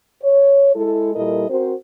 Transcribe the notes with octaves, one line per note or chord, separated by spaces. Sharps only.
C#5
G#3 E4 A4
A#2 G3 E4 A4 A#4 D#5
C4 F#4 A#4 C5